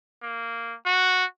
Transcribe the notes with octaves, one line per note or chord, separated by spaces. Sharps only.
A#3
F#4